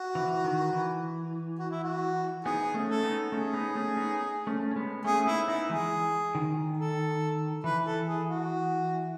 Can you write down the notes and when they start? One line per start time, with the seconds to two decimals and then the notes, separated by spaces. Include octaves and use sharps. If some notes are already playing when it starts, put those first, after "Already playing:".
Already playing: F#4
0.15 E3
0.44 D#3
0.73 E3
1.59 F#4
1.71 E4
1.83 F#4
2.45 B3 D#4 G#4
2.74 A3 C#4
2.89 A4
3.03 B3 D#4
3.31 A3 C#4 G#4
3.54 B3 D#4
3.75 A3 C#4
3.97 B3 D#4
4.47 A3 C#4
4.71 C#4
4.76 G#3 B3
5.04 A3 C#4 G#4
5.26 B3 D#4 E4
5.47 B3 D#4 E4
5.69 E3 G#3 G#4
6.35 D#3
6.77 A4
7.64 E3 B4
7.86 A4
8.07 G#4
8.29 F#4